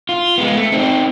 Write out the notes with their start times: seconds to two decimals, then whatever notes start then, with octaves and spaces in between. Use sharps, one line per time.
0.09 F4
0.38 G#3 B3
0.55 A3
0.72 C4 D#4